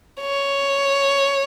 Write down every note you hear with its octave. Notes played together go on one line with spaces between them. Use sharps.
C#5